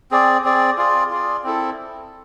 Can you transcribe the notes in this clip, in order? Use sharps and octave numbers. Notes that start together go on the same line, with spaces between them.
C4 G#4 D5
C4 G#4 D5
F4 G#4 D5
F4 G#4 D5
C4 E4 A4